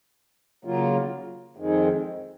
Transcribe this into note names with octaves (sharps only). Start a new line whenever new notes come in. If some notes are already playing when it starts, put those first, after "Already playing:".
C#3 F#3 A#3 F4
F2 D#3 G#3